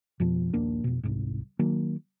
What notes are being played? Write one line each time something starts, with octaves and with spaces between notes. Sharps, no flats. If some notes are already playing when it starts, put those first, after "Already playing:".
F2 B2 F3
A#1 D#2 A#3 D4
F1 B2
D#1 C2 G#2
D#3 F#3 A#3